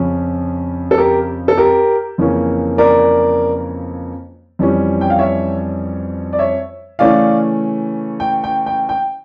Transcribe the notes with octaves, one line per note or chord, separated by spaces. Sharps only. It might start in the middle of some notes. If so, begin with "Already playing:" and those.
Already playing: F2 C#3 F3 C#4
A4
G4 A#4
A4
G4 A#4
F2 C#3 E3 A#3 C#4
A#4 D5
F2 E3 G3 C#4
G5
F5
C#5 E5
D5
C#5 E5
C#3 E3 A3 C#4 D5 F5
G5
G5
G5
G5